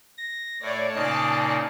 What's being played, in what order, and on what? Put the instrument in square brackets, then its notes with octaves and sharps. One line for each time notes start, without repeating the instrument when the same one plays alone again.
[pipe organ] A#6
[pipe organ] A2 [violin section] C#5 D5
[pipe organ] A#2 C#3 D#4 [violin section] D5 A5